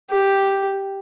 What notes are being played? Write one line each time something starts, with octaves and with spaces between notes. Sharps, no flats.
G4